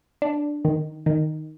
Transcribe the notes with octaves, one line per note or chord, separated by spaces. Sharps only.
D4
D#3
D#3